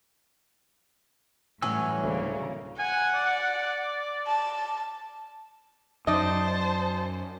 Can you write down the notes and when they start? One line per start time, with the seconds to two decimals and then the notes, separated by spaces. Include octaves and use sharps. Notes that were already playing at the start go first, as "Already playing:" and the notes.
1.62 A2 E3 F#3 G3 C#4 G#5 E6
2.04 D2 C#3 A#3
2.79 F#5 G#5
3.15 D5
4.27 A5
6.07 F#2 D#4 C5 D5 D#5 A5